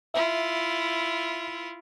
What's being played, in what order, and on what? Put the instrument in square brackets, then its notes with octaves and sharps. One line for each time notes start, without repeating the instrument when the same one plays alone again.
[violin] E4 F4 [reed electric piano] E5